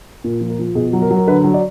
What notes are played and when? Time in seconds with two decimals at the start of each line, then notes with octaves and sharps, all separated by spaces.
0.24 A#2
0.41 F3
0.50 A#4
0.59 F3
0.75 B2 G#4
0.93 F#3
1.02 A#4
1.11 F#3
1.17 A#4
1.27 D3 B4
1.44 F#3
1.54 D5